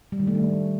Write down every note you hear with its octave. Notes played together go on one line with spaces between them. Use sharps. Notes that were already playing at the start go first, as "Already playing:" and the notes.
G3
D#3
A3
D4